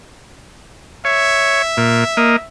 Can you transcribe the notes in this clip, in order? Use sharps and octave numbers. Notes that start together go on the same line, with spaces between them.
C#5 E5
A#2
A#3 D#5